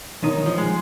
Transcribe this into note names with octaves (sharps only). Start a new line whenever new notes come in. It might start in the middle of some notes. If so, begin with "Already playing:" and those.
B1 D#3 D#4
F3
G#3